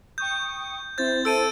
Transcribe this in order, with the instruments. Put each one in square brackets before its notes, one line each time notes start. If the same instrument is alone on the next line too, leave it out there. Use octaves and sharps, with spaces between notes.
[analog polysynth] G5 C#6 D#6 [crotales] G6
[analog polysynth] C4 E4 C5 [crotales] G6 A6
[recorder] A4 [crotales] E6 D7 D#7